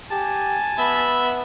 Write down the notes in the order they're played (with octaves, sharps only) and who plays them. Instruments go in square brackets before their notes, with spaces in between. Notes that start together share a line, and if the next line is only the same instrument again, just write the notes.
[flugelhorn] G4 [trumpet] G#5 [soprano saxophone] A5
[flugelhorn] B3 [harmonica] E5 B5